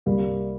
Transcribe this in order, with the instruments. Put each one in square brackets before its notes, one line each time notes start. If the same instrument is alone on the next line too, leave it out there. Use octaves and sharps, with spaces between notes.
[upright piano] C2 G3 A#3